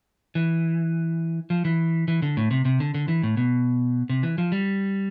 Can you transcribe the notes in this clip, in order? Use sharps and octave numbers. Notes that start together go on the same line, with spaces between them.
E3
F3
E3
E3
D3
A2
C3
C3
D3
D3
E3
A2
B2
C3
E3
F3
G3